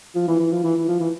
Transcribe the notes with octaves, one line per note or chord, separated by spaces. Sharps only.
F3
E3
E3
F3
E3
E3
F3
E3